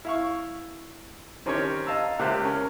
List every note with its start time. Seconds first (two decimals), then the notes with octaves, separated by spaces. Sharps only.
0.05 E4 F5 C#6
1.46 D#3 C4 C#4 G4 A#4 C#5
1.86 D#5 F5 A5 A#5 E6
2.19 C#2 A#3 G4 C5 E5 F#6
2.45 C#4 A#4